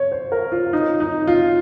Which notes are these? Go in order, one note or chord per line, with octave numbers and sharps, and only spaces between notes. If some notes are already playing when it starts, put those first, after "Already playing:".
Already playing: C#5
C5
A#4
F4
D#4
D#4
F4